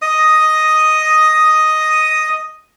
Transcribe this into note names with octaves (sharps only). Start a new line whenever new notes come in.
D#5 D#6